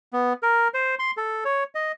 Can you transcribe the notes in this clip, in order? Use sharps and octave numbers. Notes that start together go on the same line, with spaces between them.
B3
A#4
C5
C6
A4
C#5
D#5